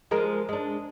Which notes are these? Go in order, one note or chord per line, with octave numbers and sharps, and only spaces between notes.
F3 G#3 A#4
G#3 D4